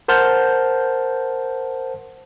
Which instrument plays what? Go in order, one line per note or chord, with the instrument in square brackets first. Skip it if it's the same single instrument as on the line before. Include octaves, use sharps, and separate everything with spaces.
[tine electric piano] A#4 C5 F#5 A5 F6 G6